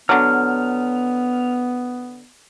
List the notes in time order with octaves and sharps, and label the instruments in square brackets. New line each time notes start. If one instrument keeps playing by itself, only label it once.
[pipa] D3 F#3 [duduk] B3 [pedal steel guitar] F6